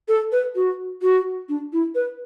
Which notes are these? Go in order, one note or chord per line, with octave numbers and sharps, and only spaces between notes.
A4
B4
F#4
F#4
D4
E4
B4